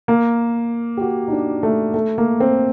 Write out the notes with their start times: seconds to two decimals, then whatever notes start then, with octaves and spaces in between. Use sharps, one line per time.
0.08 A#3
0.97 G4
1.01 F#4
1.28 D#4
1.32 D4
1.63 A3
1.94 A3
2.18 A#3
2.40 C4